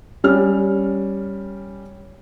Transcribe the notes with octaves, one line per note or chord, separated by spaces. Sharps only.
G3 C#4 F6